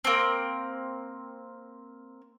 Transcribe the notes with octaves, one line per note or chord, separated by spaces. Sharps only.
A#3 C4